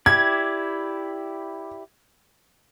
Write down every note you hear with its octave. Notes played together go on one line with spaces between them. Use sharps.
E4 G4 D5 G#6